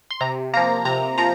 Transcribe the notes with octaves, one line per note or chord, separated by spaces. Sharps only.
C6
C3 A#5
F3 A#3 A#5
C3 A#5
F3 A#5